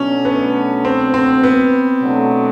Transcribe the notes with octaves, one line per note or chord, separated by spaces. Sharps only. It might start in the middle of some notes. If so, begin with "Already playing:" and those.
Already playing: B2 F#3 A3 C#4 D4
B3
C4
C4
B3
B2 F#3 A3 D4